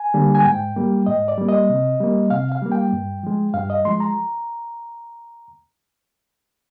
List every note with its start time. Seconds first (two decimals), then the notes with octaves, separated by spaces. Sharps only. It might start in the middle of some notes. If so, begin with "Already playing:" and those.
Already playing: G#5
0.14 D3 G3 A#3
0.35 G#5
0.45 G#2 G5
0.76 G3 A#3
1.06 G#2 D#5
1.28 D5
1.38 G3 A#3
1.49 D#5
1.69 C3
2.00 G3 A#3
2.30 C3 F5
2.52 F5
2.62 G3 A#3
2.72 G5
2.93 G2
3.23 F3 G#3
3.54 G2 F5
3.70 D#5
3.85 F3 G#3 C6
4.00 A#5